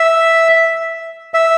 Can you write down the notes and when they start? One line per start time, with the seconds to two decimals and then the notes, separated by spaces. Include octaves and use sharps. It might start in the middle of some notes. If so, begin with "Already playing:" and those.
Already playing: E5
1.34 E5